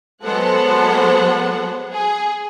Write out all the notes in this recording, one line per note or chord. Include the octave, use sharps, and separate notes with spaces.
F#3 G#3 B3 A4 C5 F#5
G#4